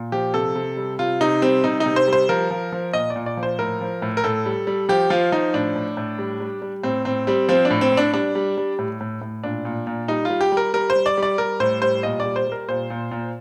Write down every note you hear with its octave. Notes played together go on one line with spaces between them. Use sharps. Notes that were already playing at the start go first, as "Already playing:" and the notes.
Already playing: A#2
F3 G4
C3 A4
C3
G3
C3 F4
C3 D#4
G3 C4
C3 D#4
D#4
C3
C5
G3
C5
F3 A#4
F3
F3
A#2 D#5
D5
A#2
D5
F3
C5
A2 A#4
F3
A2
A#4
A2 A4
G3
G3
F3 G4
F3 F4
F3 D#4
A2 D4
A2
A2
G3
G3
G3
A2 C4
A2 C4
G3 C4
F3 C4
D4
A2
C4
A2
D4
G3 D4
G3
G3
A2
A2
A2
A#2 D4
A#2
A#2
G3 D#4
F4
G3
G4
G3
A#4
G3 A#4
C5
G3
D5
G3
D5
G3 A#4
A2 C5
G3 C5
A#2 D#5
D5
G3
C5
G3 A#4
A#2 C5
A#2
A#2